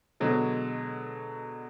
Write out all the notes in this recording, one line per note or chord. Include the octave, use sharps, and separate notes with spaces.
B2 D3 F#3 G#3